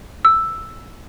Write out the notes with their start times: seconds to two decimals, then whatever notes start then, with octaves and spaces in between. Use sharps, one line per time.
0.25 E6